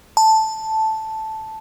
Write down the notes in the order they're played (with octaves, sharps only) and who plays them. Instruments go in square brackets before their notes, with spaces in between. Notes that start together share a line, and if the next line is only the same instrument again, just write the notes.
[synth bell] A5